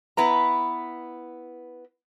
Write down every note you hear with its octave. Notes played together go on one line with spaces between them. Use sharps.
B3 E4 B4 A#5